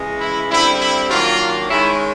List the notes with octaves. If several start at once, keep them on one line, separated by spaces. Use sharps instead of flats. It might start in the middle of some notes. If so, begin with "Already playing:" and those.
Already playing: C#3 E3 G#3
E4
D3 G3 C4 E4
E4
D#3 F#3 A#3 D4 F4
D#3 G#3 C#4 E4